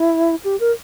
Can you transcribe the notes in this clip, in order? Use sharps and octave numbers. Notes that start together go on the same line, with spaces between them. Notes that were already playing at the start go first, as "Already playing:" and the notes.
Already playing: E4
G4
A#4